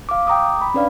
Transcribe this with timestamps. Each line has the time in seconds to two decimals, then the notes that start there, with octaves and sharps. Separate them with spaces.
0.09 F5 D6
0.27 G5 A#5 D6 D#6
0.61 B5
0.74 C#4 D4 B4 D5 F5